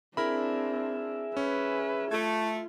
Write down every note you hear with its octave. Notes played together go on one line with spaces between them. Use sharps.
C4 D4 E4 G#4 A#4 E5 B5
C#4 B4
A3 F4 G#6